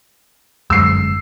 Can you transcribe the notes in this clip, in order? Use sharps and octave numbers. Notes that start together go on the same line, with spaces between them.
G1 F#2 G#3 E6 C7